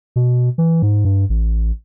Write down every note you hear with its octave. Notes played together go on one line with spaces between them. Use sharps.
B2
E3
G#2
G2
A1